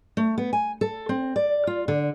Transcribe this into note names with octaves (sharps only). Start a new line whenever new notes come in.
A3
B3
G#5
A4
C4
D5
F4
D3